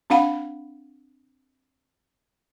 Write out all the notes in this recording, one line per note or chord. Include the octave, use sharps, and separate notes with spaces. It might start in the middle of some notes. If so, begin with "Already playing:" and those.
C4 D4 F5 F#5 B5